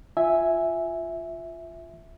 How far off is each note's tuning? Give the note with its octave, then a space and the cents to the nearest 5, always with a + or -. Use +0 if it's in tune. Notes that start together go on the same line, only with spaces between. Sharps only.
F4 +0 E5 +0 G#5 +0